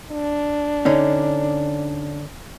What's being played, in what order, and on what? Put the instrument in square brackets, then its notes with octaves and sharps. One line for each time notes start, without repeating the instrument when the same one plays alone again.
[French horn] D4
[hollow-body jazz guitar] D3 C#4 D#4